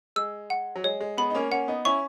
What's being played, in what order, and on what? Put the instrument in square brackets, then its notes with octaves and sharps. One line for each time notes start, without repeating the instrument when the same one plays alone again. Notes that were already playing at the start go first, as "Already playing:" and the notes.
[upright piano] G#3 [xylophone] E6
[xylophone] F#5
[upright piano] F#3
[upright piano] G#3 [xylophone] C#5
[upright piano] G#3
[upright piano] G#3 B3 [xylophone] B5
[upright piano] D#4
A#3 C#4
[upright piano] A#3 C#4 [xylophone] F#5
[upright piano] B3 D#4
[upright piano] C#4 E4 [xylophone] C#6